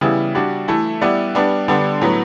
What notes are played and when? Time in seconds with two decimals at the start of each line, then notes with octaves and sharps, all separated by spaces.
0.01 C#3 E3 G3 B3 E4
0.35 G3 D4 F#4
0.68 E3 A3 E4 A4
1.01 G3 B3 E4 B4 D5
1.35 G3 B3 D4
1.68 D3 G3 B3 D4
2.02 A2 F#3 B3